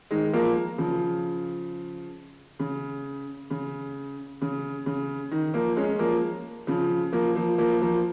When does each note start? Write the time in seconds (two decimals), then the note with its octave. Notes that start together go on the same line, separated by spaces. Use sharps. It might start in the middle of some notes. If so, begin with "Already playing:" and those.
0.11 D#3 G#3
0.33 F3 A#3
0.78 C#3 F3
2.59 C#3
3.50 C#3
4.41 C#3
4.86 C#3
5.31 D#3
5.54 F3 A#3
5.76 G#3 C#4
5.99 F3 A#3
6.67 C#3 F3
7.13 F3 A#3
7.36 F3 A#3
7.58 F3 A#3
7.81 F3 A#3